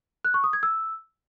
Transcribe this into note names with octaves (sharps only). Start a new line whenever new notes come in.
F#6
C#6
D#6
G#6
E6